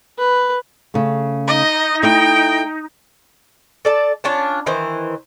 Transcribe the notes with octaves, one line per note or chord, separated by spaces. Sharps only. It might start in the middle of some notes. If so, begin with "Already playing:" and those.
B4
C#3 A3
D#4 D#5
A3 E4 G5
A4 D5 A5
C#4 D4 F4 A5
D#3 E3 C5